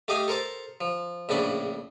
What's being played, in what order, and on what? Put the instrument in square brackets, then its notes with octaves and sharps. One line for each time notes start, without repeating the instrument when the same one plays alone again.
[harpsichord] A3 G4 D#5 F5 G#5
A4 A#4 C5 A5
F3
A#1 A2 C#3 D4 B5